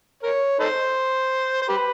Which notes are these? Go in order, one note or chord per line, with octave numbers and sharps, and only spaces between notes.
A#4 C#5
D#4 A4 C5
C5
G4 B4